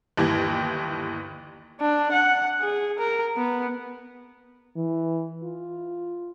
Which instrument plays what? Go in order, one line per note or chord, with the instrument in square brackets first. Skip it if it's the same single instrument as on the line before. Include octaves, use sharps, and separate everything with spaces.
[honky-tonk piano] G1 D#2 E3 G4 G5 G#6
[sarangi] D4
F#5
G#4
A#4
B3
[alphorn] E3
F4